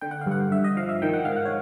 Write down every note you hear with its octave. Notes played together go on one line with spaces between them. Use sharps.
D3 G5
F#5
F5
G2 F#5
G2 E5
D#5
F3 F5
E5
D#3 G5
F#5
G#2 F5
F#5
C#5